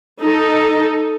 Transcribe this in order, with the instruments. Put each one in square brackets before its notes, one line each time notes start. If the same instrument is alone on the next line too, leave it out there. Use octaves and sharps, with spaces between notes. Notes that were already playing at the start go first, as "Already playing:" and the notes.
[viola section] D#4 A4